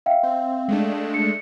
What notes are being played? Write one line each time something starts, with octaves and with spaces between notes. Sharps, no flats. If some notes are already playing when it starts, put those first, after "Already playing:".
E5 F5 G5
C4
G#3 A3 D4
C#7